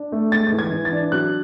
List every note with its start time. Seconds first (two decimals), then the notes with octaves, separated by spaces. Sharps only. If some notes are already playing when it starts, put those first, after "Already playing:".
Already playing: D4
0.12 A3
0.32 G#3 A6
0.47 A6
0.52 E3
0.59 G#6
0.72 E3
0.85 A6
0.92 D4
1.12 F#3 F#6